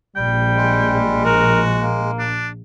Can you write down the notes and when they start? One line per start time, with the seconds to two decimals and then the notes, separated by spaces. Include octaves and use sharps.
0.16 A#1 G3 G5
0.57 G#3
1.24 F#4 A#4
1.80 A#3
2.19 D4